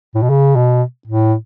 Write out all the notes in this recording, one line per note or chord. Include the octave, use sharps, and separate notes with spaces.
A2
B2
C#3
B2
A2